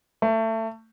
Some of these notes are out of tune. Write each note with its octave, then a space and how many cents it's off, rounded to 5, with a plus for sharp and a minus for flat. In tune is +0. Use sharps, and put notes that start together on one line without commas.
A3 +25